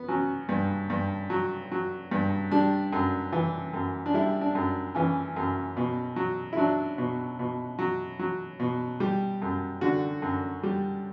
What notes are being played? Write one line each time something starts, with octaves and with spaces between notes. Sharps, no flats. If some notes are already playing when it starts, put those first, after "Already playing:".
Already playing: B3
F#3 C#4
G2
G2
F#3
F#3
G2
G3 D4
F#2
E3
F#2
D4
G3 E4
D4
F#2
E3 C#4
F#2
B2
F#3
E4
F#3 D4
B2
B2
F#3
F#3
B2
G3
F#2
D3 F#4
F#2
G3